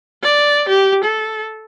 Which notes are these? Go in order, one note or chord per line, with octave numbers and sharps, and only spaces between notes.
D5
G4
A4